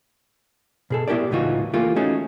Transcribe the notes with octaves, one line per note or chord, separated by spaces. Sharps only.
B2 G#4 A4
B3 E4 G4 A#4 D5
C#2 A2 E3 D#4 F4 F#4
E3 A3 A#3 F4 G4
A3 C#4 D#4 F#4 G#4